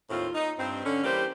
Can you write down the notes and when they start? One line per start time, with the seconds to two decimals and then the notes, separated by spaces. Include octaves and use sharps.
0.10 D#2 A2 C4 F4
0.35 D#4
0.58 G2 C4
0.84 D3 C#4
1.03 E3 G3 A#3 G4 C5